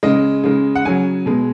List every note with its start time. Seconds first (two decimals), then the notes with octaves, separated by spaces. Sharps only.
0.03 C#3 G#3 D#5
0.44 C#3 G#3
0.75 F#5
0.85 C#3 F#3 G#5
1.26 B2 G#3